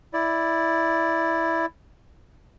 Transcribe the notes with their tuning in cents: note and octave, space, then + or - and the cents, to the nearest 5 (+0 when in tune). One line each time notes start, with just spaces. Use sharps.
E4 +0 D5 +0